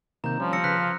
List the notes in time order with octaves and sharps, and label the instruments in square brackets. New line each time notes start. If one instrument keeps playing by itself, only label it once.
[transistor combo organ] C3 D#3 A#3 [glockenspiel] A#5 G6
[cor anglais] F3 [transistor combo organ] G3 C#4
[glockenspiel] E6 A#6 C#7
[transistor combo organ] C#3 B4 [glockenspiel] F#6 B6
[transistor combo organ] F5